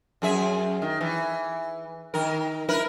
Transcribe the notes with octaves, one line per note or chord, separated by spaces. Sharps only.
F#2 G#4 E5
D#3
E3
D#3 A#4
E4 A#4 B4